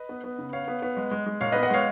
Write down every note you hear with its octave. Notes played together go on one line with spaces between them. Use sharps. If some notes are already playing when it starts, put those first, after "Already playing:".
Already playing: B4 D#5
B3
B3
C#3
B3 C#5 F5
B3
B3
G#3
G#3
G#3
A#2 C#5 F5
B3 B4 D#5
D#5 F#5
G#3 C#5 F5